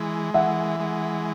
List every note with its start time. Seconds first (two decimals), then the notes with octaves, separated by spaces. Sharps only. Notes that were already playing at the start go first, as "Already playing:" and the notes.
Already playing: E3 G#3
0.34 E3 E5 F#5
0.80 G#3